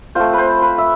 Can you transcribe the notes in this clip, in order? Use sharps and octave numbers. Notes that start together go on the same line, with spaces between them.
A3 C4 F4 C5
B4 C5
B4
E5